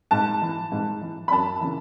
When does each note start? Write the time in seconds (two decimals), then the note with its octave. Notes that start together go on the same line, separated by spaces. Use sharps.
0.11 G#2 A5
0.42 E3
0.72 G#2
1.01 E3
1.28 B5
1.31 F#2 A5
1.61 C#3 E3